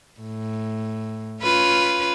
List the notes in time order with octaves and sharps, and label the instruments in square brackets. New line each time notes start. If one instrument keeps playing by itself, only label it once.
[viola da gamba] A2
C#4 F4 B4